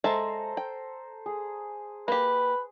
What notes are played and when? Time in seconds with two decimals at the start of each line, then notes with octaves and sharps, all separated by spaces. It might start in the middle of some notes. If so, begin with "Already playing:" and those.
0.04 G#3 A4 C5 E5 A5 A#5
0.57 G5
1.26 G#4
2.08 A#3 G4 B4